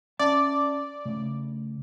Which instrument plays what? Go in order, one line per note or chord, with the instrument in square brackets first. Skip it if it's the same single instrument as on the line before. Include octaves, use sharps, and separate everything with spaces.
[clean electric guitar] C#4 E5 A5 [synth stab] D5
[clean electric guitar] C#3 A3